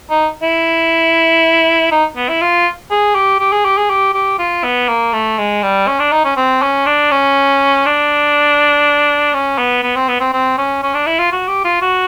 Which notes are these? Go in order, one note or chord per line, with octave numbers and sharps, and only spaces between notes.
D#4
E4
D#4
B3
E4
F4
G#4
G4
G4
G#4
G4
G#4
G4
G4
F4
B3
A#3
A3
G#3
G3
C#4
D4
D#4
C#4
C4
C#4
D4
C#4
D4
C#4
B3
B3
C4
B3
C4
C4
C#4
C#4
D4
E4
F4
F#4
G4
F4
F#4